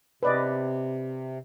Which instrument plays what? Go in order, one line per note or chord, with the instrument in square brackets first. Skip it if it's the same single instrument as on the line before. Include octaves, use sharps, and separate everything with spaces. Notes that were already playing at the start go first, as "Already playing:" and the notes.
[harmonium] C3 [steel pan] B4 D5 D#5